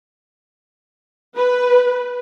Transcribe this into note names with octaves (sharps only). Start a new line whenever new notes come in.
B4